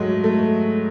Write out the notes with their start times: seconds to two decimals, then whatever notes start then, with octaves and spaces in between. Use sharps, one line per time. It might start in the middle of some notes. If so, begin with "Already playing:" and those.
Already playing: G#2 F#3 G#3 A3
0.24 A3